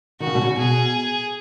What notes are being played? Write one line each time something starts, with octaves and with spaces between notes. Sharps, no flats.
D#3 F#4
C#3
B2
C#3
B2 G#4